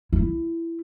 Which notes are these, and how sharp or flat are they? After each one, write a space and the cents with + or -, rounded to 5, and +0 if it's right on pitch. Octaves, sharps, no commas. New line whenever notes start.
E4 +15